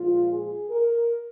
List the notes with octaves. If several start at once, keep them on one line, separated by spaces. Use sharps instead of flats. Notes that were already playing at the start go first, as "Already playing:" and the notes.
Already playing: A#2 F3 G#3 F4
G#4
A#4